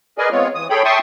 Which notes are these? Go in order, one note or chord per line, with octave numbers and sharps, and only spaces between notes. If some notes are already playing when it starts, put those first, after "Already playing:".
G#4 A#4 B4 D5 D#5 G#5
G#3 B3 C4 F4 C#5
E3 D#6
G#4 A4 C#5 G5 B5
E5 G5 A5 C6 C#6 D#6